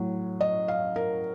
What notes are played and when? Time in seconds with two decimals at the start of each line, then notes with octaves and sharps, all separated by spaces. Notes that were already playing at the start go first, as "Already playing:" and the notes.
Already playing: A2 F#3
0.41 D#5
0.68 F5
0.96 A#4